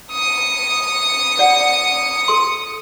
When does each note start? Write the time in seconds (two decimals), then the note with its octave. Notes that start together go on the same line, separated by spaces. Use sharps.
0.12 D#6 C#7
1.38 C5 D5 F#5
2.28 A4 C6